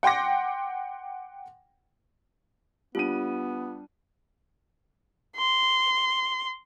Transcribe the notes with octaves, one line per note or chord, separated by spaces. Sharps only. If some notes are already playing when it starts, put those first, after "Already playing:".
F#5 G5 C6 D6 A#6
G3 B3 D4 F4 D#7
C6